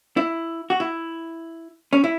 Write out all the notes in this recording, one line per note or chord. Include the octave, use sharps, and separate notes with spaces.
E4
F#4
E4
C#4
E4